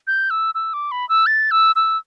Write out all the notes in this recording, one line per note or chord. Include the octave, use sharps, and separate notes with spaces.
G6
E6
E6
D6
B5
E6
A6
E6
E6